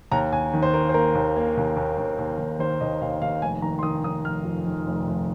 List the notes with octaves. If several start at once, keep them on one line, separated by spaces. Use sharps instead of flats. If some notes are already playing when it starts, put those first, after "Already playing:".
D#2 A#5
D#2 G#5
D#3
C5
A#3 A#4
C5
A#3 A#4
D#2
A#3
D#2
D#2
D#2
D#2
D#2
D#3 C5
D#2 D#5
D#2 F5
D#2 F5
F1 G#5
D#3 A#5
C6
D#3 D#6
D#3 D#6
F1 F6
F2
D#3
F1
F1